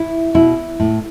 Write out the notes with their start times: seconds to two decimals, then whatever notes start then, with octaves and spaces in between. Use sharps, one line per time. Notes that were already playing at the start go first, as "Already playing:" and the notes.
Already playing: E4
0.34 B2 E4
0.80 A2